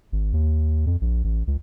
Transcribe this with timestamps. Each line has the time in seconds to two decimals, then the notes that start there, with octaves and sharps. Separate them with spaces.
0.12 G#1
0.33 D#2
0.86 F2
1.01 A#1
1.24 A1
1.47 C#2